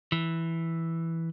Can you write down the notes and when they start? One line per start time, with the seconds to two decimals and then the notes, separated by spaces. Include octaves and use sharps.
0.12 E3